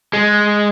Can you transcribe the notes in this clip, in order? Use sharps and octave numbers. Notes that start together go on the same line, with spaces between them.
G#3